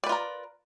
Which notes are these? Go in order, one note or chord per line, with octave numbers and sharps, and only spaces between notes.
F4 A#4 B4 D5